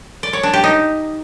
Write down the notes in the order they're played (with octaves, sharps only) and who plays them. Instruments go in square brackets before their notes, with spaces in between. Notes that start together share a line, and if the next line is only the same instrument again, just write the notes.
[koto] D5
C#5
D4
G4
D#4